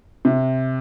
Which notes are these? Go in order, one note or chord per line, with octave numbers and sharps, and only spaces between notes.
C3